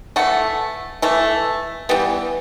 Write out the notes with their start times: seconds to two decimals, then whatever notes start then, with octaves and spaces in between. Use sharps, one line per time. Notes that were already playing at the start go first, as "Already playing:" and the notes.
0.16 E3 A3 F#5
1.02 E3 A3
1.89 E3 G3 B3